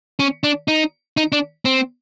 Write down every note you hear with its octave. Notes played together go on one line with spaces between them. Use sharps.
C#4
D4
D#4
D#4
D4
C4